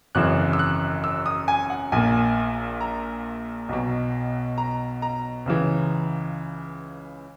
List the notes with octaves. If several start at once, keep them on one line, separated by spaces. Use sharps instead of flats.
G#1 F#2 C#3 E3 F#6
E6
F#6
E6
D#6
G#5
F#5
A#1 A#2 G#5
A#5
B1 B2
A#5
A#5
C#2 C#3 E3